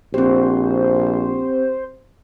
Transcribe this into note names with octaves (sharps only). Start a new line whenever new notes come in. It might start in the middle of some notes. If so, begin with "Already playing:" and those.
A#1 C4 G4 C5